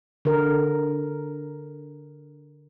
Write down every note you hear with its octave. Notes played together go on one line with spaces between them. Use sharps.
D3 A#4